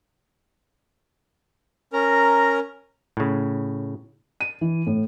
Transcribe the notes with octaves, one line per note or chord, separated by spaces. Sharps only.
C#4 A#4 A#5
A2 C#3
D#7
E3
A2